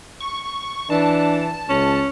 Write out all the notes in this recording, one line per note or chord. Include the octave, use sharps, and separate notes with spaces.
C#6
E3 D4 A5
C#2 C#4